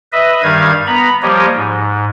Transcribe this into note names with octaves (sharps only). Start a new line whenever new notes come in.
B4 D#5 E5
G2 D#3 G3 F5 G#6
B3 A#5 B5
F3 G3 A#3 G4 C#5 D#5
G#2